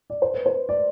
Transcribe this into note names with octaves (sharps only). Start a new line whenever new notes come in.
D5
C5
B4
C5
D5